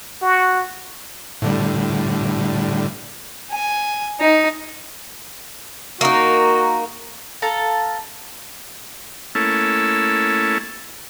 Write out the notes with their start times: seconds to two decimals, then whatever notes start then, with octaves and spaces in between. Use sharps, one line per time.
0.22 F#4
1.42 A2 D3 G3
3.51 G#5
4.21 D#4
6.01 A#3 D#4 F#4
7.42 A4 F5 A5 A#5
9.35 A3 A#3 C#4 E4 A4